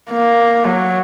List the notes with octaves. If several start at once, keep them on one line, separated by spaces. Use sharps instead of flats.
A#3
F#3